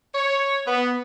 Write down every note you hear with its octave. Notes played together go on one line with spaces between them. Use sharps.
C#5
B3